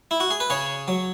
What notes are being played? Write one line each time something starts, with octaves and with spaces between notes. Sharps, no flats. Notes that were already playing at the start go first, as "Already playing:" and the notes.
E4
F#4
G#4
B4
C#3 G#4 C#5
F#3